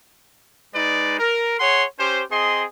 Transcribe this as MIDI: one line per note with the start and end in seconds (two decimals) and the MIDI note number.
0.74 1.17 56
0.74 1.17 63
0.74 1.17 71
0.74 1.17 74
1.19 1.54 70
1.59 1.84 68
1.59 1.84 73
1.59 1.84 78
1.59 1.84 84
1.98 2.22 61
1.98 2.22 67
1.98 2.22 72
2.31 2.64 60
2.31 2.64 68
2.31 2.64 75
2.31 2.64 84